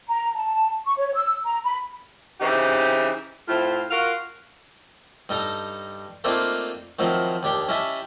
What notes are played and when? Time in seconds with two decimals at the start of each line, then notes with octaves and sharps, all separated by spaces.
0.08 A#5
0.35 A5
0.86 C#6
0.98 C#5
1.15 E6
1.45 A#5
1.65 B5
2.40 C#3 E3 C4 D#4 G4
3.48 A2 A3 C4 F4
3.91 F4 F#4 A#4 F5
5.29 G2 D#4 A4 G5 A#5
6.24 A3 A#3 C4 D4 D#4 F4
6.99 D#3 F3 F#3 C4 D#4 E4
7.43 D#2 D4 G4 G5
7.68 C#4 E4 G4 D#5 E5 A5